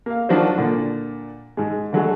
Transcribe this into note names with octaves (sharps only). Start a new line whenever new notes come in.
A#3 F5
D#3 F3 F#3 D4 F#4 C5
A#2 D3
G#2 G#3
D3 F#3 G#3 A3